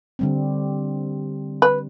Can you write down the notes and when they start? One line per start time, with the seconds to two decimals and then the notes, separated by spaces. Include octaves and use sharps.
0.19 D3 G3 C4
1.62 B4